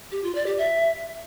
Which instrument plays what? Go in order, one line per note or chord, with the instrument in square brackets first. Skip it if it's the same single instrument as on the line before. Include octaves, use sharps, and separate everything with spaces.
[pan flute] G4
F4
D5
G4
E5